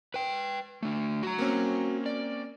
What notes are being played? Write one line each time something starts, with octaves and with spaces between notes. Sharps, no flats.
B4 G5
D3 A3
F#4 A#5
A#3 C4 C#4
D5